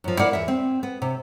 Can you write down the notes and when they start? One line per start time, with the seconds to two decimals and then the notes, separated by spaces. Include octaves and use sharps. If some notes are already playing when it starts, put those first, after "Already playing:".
0.04 F#2 F3
0.19 E4 A#4 D5 F5 F#5
0.33 E2 E5
0.48 C4
0.83 B3
1.02 C3